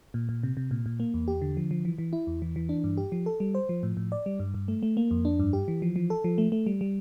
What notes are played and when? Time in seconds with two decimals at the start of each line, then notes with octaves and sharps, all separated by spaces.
0.14 A#2
0.29 A#2
0.43 C3
0.57 C3
0.71 A#2
0.86 A#2
1.00 A#3
1.14 E2
1.28 G4
1.42 D3
1.57 F3
1.71 F3
1.85 E3
1.98 E3
2.13 E4
2.27 E2
2.42 E3
2.56 E3
2.69 D4
2.84 G2
2.97 G4
3.12 F3
3.26 A4
3.40 G3
3.55 C5
3.69 F3
3.83 A2
3.97 A2
4.12 D5
4.26 G3
4.40 G2
4.54 G2
4.68 A3
4.83 A3
4.97 A#3
5.11 F2
5.25 D4
5.39 G2
5.53 G4
5.68 E3
5.82 F3
5.96 F3
6.10 A4
6.24 F3
6.38 A3
6.52 A3
6.66 G3
6.81 G3